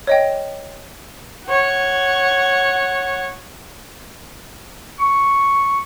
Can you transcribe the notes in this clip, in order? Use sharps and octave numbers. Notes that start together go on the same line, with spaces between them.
C#5 D#5 G5
C#5 F#5
C#6